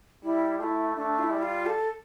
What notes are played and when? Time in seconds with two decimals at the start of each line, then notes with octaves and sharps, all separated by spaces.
0.24 G3 E4
0.60 A3 E4 F4
0.96 A3 D4
1.19 F4
1.23 E4
1.31 G3
1.42 F4
1.66 A4